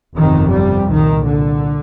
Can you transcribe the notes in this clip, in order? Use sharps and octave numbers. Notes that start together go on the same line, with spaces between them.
G1 F2 C3 D#3
G3
C2 A#2 D#3
D3